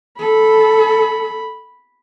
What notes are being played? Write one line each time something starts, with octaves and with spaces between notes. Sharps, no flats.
A4 B5